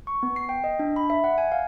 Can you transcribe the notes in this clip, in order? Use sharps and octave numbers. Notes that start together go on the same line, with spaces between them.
C#6
B3
C7
G5
D#5
D4
B5
E5
F#5
G#5
F5